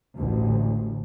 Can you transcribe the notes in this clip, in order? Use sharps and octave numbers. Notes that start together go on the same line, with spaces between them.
A1 D2